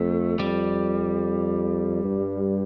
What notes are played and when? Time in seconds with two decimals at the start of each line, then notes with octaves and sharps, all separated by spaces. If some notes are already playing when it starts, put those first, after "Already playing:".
Already playing: F2 A3
0.39 F2 G3
2.04 G2